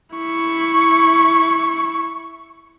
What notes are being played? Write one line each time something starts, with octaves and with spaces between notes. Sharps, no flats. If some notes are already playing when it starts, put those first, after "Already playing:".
E4 C#6